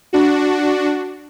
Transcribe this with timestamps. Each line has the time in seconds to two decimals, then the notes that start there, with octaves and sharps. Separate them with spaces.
0.13 D4 F#4